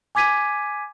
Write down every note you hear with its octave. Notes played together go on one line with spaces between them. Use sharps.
G#5 D6 G#6 B6 D#7